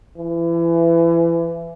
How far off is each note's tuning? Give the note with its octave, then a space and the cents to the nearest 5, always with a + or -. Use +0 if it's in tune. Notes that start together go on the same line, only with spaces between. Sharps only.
E3 +30